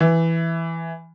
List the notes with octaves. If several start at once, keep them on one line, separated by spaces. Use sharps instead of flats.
E3